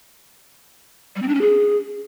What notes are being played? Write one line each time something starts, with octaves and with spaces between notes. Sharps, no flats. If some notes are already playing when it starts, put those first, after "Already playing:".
G3
C4
D4
C#4
G#4